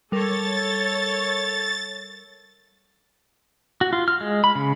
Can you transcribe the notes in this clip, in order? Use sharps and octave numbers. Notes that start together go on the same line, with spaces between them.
G3 A4 A#4 C#5 A6
F#4
F4
F6
G#3
B5
C#3